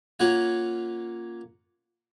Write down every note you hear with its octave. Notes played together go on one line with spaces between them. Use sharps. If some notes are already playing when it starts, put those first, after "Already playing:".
A#3 C#4 F4 F#5 G#5